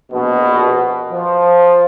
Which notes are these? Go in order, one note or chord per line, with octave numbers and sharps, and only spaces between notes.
A#1 B2
F3